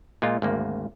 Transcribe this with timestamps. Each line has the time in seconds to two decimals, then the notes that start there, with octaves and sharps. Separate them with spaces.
0.22 A#2 G#3 F4
0.42 G#1 D2 A#3